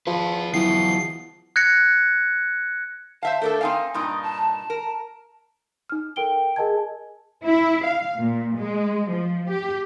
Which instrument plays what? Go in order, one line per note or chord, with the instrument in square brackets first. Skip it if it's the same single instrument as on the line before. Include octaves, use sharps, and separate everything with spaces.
[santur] F3 [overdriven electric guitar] G#4 B4
[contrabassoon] E2 [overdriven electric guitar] E3 F#3 [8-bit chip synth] C7
[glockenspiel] F#6 G#6 A#6 C#7
[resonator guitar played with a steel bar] C5 E5 F5 [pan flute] A5
[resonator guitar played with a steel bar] A3 D4 A4 [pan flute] A#4
[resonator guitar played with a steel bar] C4 D#4 F5 [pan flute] G#5
[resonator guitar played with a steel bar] G2 A#2 D#4 [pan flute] D#6
[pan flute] A5
[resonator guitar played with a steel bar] A#4
[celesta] D#4 F6
A4 A#4 G5 D7 G7
G#4 A#4 D#5 G#5 A5 G#6
[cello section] E4
F5
A#2
G#3
F3
G4